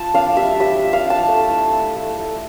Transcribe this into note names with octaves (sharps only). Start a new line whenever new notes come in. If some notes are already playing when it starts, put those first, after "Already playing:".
Already playing: F4 A5
D4 F5
G3 E5
G3 E5
F4
F5
D4 A5
A3
E4
E4
A3
A3